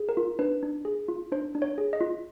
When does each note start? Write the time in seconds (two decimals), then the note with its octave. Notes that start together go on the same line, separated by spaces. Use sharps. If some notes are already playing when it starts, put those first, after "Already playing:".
Already playing: G#4
0.09 A#4
0.17 F4
0.39 D4 B4
0.63 D4
0.85 G#4
1.08 F4
1.32 D4 C5
1.55 D4
1.62 C#5
1.78 G#4
1.93 D#5
2.01 F4